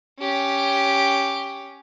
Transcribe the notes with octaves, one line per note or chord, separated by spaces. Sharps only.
C#4 G4